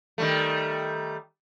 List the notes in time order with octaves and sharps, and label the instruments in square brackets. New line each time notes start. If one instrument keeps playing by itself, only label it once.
[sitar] D#3 G3 A3